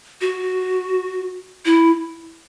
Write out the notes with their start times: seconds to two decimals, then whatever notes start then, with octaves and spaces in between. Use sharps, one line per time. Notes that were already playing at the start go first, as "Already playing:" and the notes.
0.21 F#4
1.66 E4